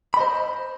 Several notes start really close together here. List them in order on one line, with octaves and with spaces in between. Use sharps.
B5 D#5 C5